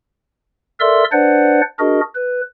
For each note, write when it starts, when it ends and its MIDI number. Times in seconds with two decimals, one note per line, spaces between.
0.80 1.04 69
0.80 1.04 70
0.80 1.04 74
0.80 1.04 76
0.80 1.04 84
0.80 1.04 88
1.12 1.61 62
1.12 1.61 71
1.12 1.61 72
1.12 1.61 74
1.12 1.61 78
1.79 2.00 62
1.79 2.00 66
1.79 2.00 68
1.79 2.00 70
1.79 2.00 75
2.15 2.41 71